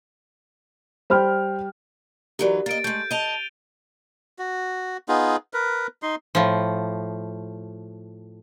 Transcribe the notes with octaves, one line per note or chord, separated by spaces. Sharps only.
G3 C5 G5 B5 F6
E3 F#3 D#4 G4 A#4 D5
A#3 D#5 A6 D7
G#3 A3 G6
D#5 A5 D#7 F7 G7
F#4
B3 D#4 F4 G#4
A#4 B4
D#4 C6
A2 F3